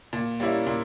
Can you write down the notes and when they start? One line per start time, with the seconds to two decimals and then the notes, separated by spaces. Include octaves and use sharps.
0.13 A#2
0.40 G3 A#3 C#4 E4
0.67 A#2